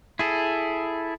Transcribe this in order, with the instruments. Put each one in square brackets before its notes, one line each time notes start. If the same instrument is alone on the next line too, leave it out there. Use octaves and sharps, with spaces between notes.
[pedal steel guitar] E4 G#4 A4